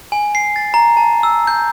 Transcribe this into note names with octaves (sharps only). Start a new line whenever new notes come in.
G#5
C7
A6
A#5
A5
E6
G6